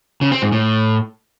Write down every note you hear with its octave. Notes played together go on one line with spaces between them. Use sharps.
C#3
C4
G#2
A2